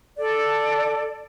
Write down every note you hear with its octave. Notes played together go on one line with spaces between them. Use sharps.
A4 D5